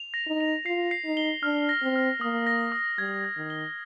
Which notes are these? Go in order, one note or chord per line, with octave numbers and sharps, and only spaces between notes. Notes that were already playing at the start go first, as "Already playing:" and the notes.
Already playing: F7
A#6
D#4
F7
F4 C7
C7
D#4
G7
D4 F6
A#6
C4
F6
A#3 D#6
A#6
D#6
G3 G#6
G#6
D#3
G7